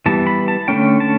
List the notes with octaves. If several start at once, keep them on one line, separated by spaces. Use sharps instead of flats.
E3 G3 B3 A5
B5
A5
D3 A3 C#4 G5
A5